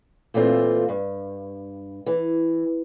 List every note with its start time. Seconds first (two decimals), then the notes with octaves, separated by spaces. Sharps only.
0.34 A#2 E3 A3 C4 F4
0.89 G2
2.06 E3